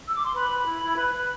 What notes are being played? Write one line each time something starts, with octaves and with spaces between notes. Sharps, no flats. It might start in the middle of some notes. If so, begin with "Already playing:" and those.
E6
D6
C6
B4 B5
B4
E4
E4
B4
B4